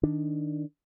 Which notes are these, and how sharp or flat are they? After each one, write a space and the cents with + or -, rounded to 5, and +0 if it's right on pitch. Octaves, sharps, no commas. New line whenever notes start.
D#3 +0 D4 +0